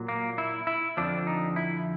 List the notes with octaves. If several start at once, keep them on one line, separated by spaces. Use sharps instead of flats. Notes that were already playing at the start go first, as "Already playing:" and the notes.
Already playing: A#2 F#3
A#3
E4
E4
F2 D3 F3 D4
D#4
E4